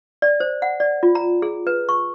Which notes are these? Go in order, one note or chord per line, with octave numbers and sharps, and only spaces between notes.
D5
C5
F#5
D5
F4
A#5
G#4
B4
C#6